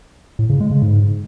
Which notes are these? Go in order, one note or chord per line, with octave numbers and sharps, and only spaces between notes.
A2
C#3
G#3
C#3
G#2